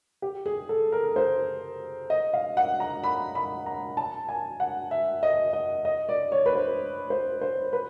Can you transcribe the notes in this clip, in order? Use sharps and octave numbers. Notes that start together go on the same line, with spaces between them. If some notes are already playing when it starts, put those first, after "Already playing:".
G4
G#4
A4
A#4
C5
D#5
F5
F#5
A#5
B5
B5
A#5
A5
G#5
F#5
E5
D#5
D#5
D#5
D5
C#5
B4
C5
C5
C5
B4